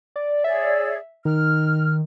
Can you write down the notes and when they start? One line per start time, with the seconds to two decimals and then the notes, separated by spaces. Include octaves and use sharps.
0.16 D5
0.44 G#4 C#5 D5 E5
1.25 D#3 F6